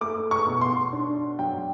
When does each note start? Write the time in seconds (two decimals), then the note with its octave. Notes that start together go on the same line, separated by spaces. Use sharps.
0.01 A3 D6
0.31 C#6
0.47 B2
0.61 C6
0.93 D4
1.39 F#3 G5